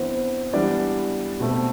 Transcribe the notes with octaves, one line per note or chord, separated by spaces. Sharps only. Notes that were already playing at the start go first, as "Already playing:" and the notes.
Already playing: E3 B3 C4 D4 C5
E3 G3 B3 D4 D5
B2 A3 C4